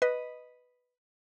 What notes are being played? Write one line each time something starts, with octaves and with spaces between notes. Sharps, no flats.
B4 D#5